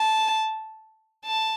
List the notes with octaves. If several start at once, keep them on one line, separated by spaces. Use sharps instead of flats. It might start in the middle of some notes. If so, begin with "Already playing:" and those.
Already playing: A5
A5